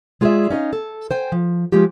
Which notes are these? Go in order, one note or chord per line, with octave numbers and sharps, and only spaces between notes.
G#3 F4 G#4 C5 D5 E5
C#4 D#4 D5 D#5 F5
A4
C5 G5 G#5
F3
F3 G#3 F4 G4